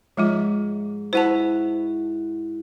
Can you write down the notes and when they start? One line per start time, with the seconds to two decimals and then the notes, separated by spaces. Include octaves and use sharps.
0.17 G#2 F3 G#3 F4
1.13 E4 F#4 B4 C5 F#5 A5